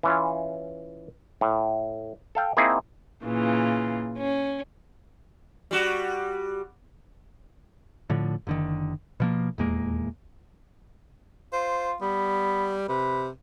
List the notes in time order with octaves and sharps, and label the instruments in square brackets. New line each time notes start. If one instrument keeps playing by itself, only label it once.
[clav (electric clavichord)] E3 C#4 F4
A2
A4 F5 G5
A#3 C4 D#4 E4 G#4
[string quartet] A#2 C#3 E3 F4
C#4
[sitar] G3 F#4
[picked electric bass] A2 D3 F3
F#1 D3 D#3
B2 F3 A#3
D#1 E2 G#3 A#3
[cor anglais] F4 [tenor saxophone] C5
[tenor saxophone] G3 [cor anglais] B3
[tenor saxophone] C3 [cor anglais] B4